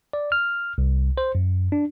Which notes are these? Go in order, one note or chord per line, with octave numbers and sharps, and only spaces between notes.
D5
F6
C2
C5
F#2
D4